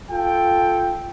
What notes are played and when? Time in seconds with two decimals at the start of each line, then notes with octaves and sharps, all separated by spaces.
0.10 F4 A4 G5